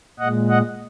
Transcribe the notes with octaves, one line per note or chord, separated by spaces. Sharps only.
A#2 G#3 D#5 F#5
D#5 F#5